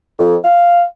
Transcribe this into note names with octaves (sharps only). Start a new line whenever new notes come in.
F2
F5